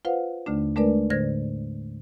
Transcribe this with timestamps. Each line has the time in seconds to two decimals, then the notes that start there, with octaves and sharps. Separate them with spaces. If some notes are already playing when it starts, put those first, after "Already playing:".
0.05 F4 B4 C5 F5 F#5
0.46 D#2 D3 A3 D4
0.76 G#3 A3 D4 A#4 B4 D5
1.10 A2 D3 C5 G#6 A#6